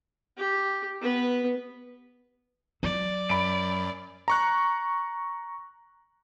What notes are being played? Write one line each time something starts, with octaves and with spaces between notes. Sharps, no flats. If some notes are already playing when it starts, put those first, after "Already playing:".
G4
B3 B4
F#3 D5
F#2 B5 D7
A#5 C#6 F#6